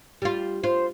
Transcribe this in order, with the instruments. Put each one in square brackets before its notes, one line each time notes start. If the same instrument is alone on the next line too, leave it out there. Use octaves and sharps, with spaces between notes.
[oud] G3 F4
[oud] F4 [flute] C5